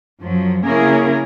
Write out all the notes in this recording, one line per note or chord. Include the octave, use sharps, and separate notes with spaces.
F#2 F3 F#3
C#3 A#3 C#4 E4 G#4 A#4